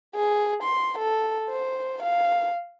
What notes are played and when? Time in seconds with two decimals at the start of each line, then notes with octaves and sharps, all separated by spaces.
0.15 G#4
0.63 C6
0.99 A4
1.50 C5
2.02 F5